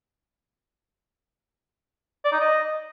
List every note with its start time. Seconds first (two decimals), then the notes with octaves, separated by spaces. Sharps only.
2.25 D5
2.32 D#4
2.40 D#5